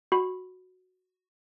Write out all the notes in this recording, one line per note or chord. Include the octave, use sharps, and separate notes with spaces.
F#4 B5